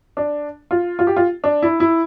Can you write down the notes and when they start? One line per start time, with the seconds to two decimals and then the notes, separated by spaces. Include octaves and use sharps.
0.17 D4
0.71 F4
0.99 F4
1.07 G4
1.17 F4
1.44 D4
1.62 E4
1.80 E4